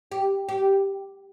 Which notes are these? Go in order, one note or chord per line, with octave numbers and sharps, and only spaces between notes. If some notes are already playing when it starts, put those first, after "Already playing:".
G4
G4